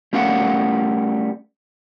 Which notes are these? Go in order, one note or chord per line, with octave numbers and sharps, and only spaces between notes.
G3 A3 C#4 A#4 F5 F#5